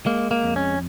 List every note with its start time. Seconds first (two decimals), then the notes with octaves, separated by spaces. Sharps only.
0.06 G#3 A#3
0.31 A#3
0.43 F2
0.56 C#4